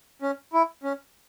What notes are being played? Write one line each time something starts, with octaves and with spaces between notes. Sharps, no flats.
C#4
E4
C#4